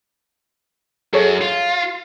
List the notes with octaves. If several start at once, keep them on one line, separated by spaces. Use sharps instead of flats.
F#2 G#4 A4 C#5
F4